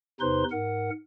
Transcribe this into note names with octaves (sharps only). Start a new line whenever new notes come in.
E2 C3 D#4 B4 C5 C6
G#2 A#4 F#5